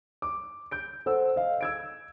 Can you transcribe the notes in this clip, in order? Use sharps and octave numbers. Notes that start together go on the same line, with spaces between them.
D6
G6 D7
A4 C5 F#5 E6
D#5 F5
E6 G#6 D7